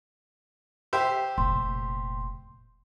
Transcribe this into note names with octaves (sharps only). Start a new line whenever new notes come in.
G4 C5 E5
F1 A#2 C6